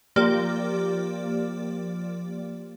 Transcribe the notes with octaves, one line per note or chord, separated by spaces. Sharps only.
F3 A#3 G4 D5